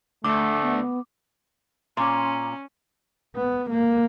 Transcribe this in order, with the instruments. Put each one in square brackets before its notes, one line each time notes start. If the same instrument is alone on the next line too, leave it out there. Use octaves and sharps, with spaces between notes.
[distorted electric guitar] D2 [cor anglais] A3 [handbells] D6
[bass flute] B3
[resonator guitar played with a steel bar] A#2 [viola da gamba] C#4 [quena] A#5 [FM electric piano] C6
[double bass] B3
A#3